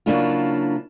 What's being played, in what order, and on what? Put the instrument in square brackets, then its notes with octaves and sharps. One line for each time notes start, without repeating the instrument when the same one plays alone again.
[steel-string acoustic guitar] C#3 F#3 A#3 D4 E4 F4